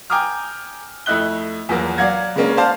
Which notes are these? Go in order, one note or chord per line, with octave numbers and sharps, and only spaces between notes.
G5 G#5 A#5 D6 D#6 F6
F2 A3 E4 D#5 F#6 G7
E2 F3 F#3 A#3
F#3 D5 F5 F#5 G#6 A#6
C#3 G#3 A#3 C#4 D4
C5 D5 F5 A5